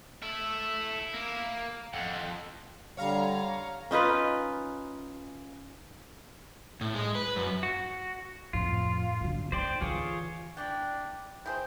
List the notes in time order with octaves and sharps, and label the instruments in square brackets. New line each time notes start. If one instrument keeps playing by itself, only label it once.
[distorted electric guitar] E4 [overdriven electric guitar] A4 E5
[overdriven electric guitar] A#3
[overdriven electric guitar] F2 [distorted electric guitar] D#3 F#5
[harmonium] D3 G3 [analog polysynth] C#5 F5 A#5
[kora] C#4 D#4 F4 B4
[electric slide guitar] A2
G#3
B4
F#2
[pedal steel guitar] F#4
[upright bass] F2 A2 [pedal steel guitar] F4
[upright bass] F#2 D3
[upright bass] D#4 E4 [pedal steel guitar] C5 D5 G5
[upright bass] D3 E3 [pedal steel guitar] F4 G#4 C#5
[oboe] D4 [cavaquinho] E4 D5 G5
[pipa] E4 G#4 C5 [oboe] G5